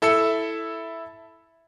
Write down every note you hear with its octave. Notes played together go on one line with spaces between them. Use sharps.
E4 A4 E5 E6 C#7